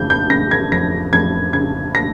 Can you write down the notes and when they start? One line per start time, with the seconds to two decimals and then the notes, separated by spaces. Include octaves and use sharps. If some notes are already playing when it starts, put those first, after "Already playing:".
Already playing: F2 C#3 G6
0.10 G6
0.30 C#3 A#6
0.51 G#6
0.72 F2 A#6
1.13 F2 G#6
1.53 C#3 G#6
1.95 A#6